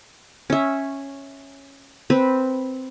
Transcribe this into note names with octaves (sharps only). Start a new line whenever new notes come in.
C#4 E5
C4 B4